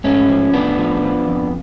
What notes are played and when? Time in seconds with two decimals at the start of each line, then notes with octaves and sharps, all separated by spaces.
0.04 G#2 A3 C#4
0.29 F3
0.53 A2 B3 D4
0.78 F3
1.03 F3
1.28 F2